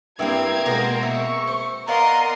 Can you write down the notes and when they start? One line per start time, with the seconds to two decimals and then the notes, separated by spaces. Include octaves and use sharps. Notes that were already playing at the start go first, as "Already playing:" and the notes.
0.19 G2 A#3 C4 E4 F#4 G4 G#6
0.66 B2 G#3 A#4 C5
1.03 E5 C#6
1.48 C5
1.88 B3 A#4 D5 D#5 F5 C6